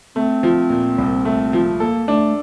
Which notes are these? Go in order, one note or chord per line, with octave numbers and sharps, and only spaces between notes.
A3 C4
F3
A#2
C2
A3
F3
A#3 A4
A3 D4